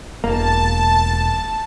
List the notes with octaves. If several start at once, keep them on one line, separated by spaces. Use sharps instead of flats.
E1 A#3 A5